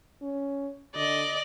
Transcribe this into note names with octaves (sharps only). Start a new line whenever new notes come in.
C#4
D3 D5 D#5